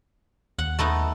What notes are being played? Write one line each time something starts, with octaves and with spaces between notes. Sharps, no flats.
D#2 F#5
A3 B3 D#4